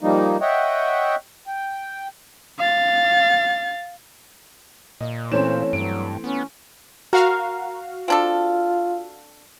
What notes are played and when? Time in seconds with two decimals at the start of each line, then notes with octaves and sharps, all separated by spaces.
0.01 F3 G3 A#3 D#4
0.41 C#5 D#5 E5 F#5 G5
1.47 G5
2.59 F5 A6
5.01 A#2 D#5
5.32 E3 A3 C4 C#4 C5 C#5 E7
5.73 G2 F#3 D7
6.24 B3 C#4
7.13 F#4 A#4 F5
8.08 C4 D4 F4 A4